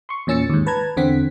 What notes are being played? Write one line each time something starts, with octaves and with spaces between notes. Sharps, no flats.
C6 C#6
E2 A#2 C#4 E6 A6 C#7
D#2 G#2
B4 A5 A#5 G#6
E2 D3 C4 F#5 B6